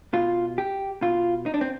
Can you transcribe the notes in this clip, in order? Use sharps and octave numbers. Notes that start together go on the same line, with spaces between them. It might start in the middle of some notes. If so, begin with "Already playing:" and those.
B2 F4
G4
B2 F4
D#4
D4
C4